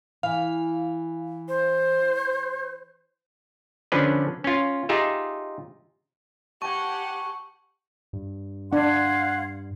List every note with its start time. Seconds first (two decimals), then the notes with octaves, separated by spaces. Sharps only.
0.23 E3 F5
1.48 C5
3.92 D3 F3 C#4 D4 B4
4.44 C#4 F4
4.89 D#4 F4 G4 G#4 E5
6.62 G4 F#5 G#5 A5 C#6
8.13 G2
8.73 D4 F5 F#5 C6 G#6